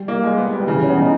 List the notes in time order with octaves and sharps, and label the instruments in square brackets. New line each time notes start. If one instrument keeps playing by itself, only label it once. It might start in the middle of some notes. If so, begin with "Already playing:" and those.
Already playing: [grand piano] G3
[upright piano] A#3
G#3
B3
B3
[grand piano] G3
[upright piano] C#3 [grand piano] E3
[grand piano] E3 [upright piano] C#4
[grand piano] B3
[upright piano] C#3 [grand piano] D#4